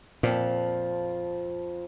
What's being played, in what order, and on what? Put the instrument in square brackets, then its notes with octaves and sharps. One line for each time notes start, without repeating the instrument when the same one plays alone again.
[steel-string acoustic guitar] F2 F3 [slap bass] A#2